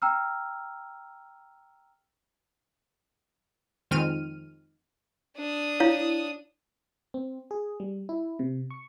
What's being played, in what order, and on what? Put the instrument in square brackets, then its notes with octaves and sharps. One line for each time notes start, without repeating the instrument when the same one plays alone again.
[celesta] G5 A#5 E6 F6
[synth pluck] F2 D#3 G#3 C4 F6 D#7
[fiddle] D4 D#6
[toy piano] E4 C#5 F5
[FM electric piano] C4
G#4
G3
E4
C3
C#6